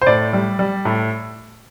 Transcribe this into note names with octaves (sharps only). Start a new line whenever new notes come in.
C5
A2 D5
G3
G3
A2